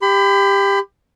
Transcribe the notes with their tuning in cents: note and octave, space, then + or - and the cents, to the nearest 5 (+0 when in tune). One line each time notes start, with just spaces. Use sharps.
G4 +15 B5 +40